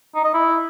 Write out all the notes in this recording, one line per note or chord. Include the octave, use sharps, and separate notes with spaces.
D#4
D#5
E4